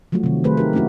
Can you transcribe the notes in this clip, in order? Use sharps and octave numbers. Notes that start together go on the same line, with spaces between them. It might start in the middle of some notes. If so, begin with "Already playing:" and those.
F3 F#3 A3 F4 F#4
C3 D#3
D#3 A3 F4 G#4 B4 C5
D#4 G4 A#4
A3 A#3 C#4 E4 F#4